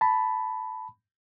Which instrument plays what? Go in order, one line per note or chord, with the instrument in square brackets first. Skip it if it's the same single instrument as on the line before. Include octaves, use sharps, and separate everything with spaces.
[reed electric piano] A5 B5